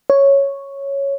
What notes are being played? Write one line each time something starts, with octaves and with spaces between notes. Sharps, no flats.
C#5